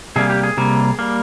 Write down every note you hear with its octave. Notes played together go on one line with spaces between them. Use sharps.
C3 G3 A#3 G#4
G4
G#4
C3 G3 A#3
G3 A#3